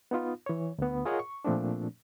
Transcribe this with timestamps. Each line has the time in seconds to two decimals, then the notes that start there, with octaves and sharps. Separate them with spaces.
0.11 B3 D#4 F4
0.46 E3 C#5
0.78 D2 B3
1.05 F4 G#4 A#4 C#5 D#5 F#5
1.19 C#6
1.45 A#2 F3 A3 C4 D4